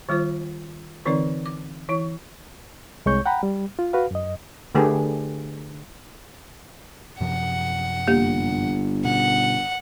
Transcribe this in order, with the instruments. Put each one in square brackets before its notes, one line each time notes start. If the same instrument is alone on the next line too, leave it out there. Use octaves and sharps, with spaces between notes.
[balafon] D#3 G3 F4 C5
D3 E3 C4 D#4 A#4 D5
D6
E3 E4 C#5
[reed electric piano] C2 G#3 C#5 C#6 G6
F#5 G5 A#5 B5
G3
F4
F#4 B4 F5
F#2 D#5
[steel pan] D3 A3 G4 G#4 B4
[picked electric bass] F#2 C3 F3 [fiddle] F#5
[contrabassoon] G1 [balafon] A#3 G4
[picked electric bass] B2 C#4 [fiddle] F#5